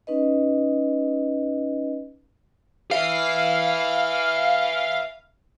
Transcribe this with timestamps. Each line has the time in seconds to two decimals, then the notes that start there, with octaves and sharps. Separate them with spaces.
0.07 C#4 D#4 B4 D#5
2.91 B4 E5 F5